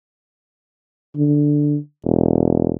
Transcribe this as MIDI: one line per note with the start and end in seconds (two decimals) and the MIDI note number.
1.16 1.76 50
2.05 2.73 28